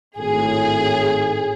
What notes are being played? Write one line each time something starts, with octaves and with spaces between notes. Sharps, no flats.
G#1 A2 G#4